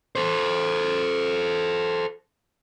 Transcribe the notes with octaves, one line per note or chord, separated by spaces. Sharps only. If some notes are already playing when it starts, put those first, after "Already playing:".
A4 C5